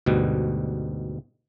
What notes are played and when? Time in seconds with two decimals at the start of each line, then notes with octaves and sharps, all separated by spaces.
0.06 D2 G#2 B2 G3